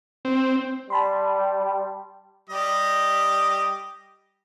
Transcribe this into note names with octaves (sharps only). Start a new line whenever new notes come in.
C4
G3 A5 B5 C6
G3 G4 D#5